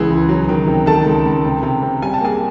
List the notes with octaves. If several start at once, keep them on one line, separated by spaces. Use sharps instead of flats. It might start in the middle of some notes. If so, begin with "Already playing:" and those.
Already playing: C#2 E3 G#4
C#2
F#3
D#3
C3
D#3 A4 A5
C#2
C#2
C3
C3
C3
G3 G#5
A5
A#3 G#4 G#5